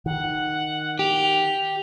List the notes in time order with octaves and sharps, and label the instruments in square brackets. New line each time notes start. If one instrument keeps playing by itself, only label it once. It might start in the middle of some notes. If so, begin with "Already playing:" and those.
[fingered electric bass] D#3 [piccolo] F#5
[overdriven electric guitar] G4 [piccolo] F7